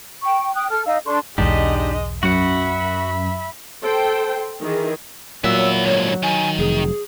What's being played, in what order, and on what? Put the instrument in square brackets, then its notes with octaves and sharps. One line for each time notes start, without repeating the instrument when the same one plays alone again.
[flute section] G5 C#6
G5 D#6 F#6
A4 F6
D#4 D#5 F5 E6
D4 A4 C6 C#6
[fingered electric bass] B1 E2 G#2 [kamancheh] G#3 D#5 [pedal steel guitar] D4 D#4 G4
[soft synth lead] F#2 [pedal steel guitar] F#4 F#5 [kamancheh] E5 B5
[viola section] A4 C5 G5
D#3 E3 G#4
[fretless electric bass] A#2 [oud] F#3 [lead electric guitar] B3 E5 [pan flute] E6
[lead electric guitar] D2 G#2 [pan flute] C#5
[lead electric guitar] D#3 [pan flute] G#5
[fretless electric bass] F1 [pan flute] G#4